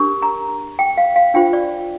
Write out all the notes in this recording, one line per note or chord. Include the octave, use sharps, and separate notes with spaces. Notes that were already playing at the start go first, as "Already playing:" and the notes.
Already playing: D4 G4 A#4
A#5
G5
F5
F5
D4 F4 C5 G5
D5